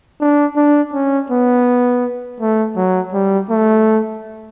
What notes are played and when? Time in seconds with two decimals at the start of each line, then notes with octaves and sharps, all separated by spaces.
0.20 D4
0.56 D4
0.93 C#4
1.30 B3
2.40 A3
2.76 F#3
3.13 G3
3.50 A3